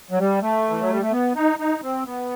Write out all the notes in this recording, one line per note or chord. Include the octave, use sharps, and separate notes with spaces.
F#3
G3
A3
E3
F#3
G3
A3
B3
D#4
D#4
C4
B3